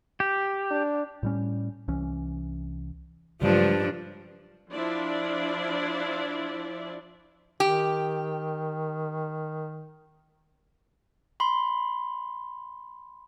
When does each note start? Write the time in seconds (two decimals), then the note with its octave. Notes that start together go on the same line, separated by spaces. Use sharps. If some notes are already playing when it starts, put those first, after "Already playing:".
0.20 G4
0.70 D4
1.23 A2 G3 C#4
1.88 C2 E3 C#4
3.42 G2 C#3 F3 F#3 G#3 D4
4.73 F3 D4 E4 D5
7.60 D#3 G4
11.40 B5 C6